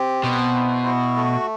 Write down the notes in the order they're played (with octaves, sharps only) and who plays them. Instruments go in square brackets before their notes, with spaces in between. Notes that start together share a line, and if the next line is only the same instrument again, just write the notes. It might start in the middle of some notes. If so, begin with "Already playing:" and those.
Already playing: [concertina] C4 G4
[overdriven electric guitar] B2 [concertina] C5
[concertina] E4
F#4
A3